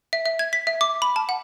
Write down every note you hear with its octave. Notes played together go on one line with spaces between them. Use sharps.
E5
E5
G#6
B6
E5
D6
B5
A5
F#5